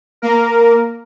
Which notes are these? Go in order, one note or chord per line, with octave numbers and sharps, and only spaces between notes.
A#3 A#4